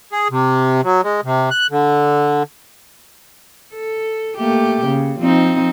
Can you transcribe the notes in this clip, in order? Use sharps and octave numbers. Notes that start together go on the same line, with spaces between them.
G#4
C3
F#3
G#3
C3
F#6
D3
A4
A3 A#3 G4
C#3
F3 C4 D#4